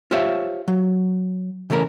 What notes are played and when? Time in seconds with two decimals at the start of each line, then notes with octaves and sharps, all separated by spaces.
0.11 F4 G4 C5 C#5 E5 F5
0.68 F#3
1.70 C#3 E3 A3 C#4 A#4